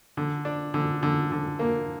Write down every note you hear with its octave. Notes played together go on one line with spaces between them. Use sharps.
D3
D4
D3
D3
D3
A#3